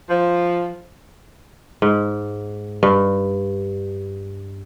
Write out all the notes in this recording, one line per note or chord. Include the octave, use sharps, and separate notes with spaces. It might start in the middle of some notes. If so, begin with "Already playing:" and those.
F3
G#2
G2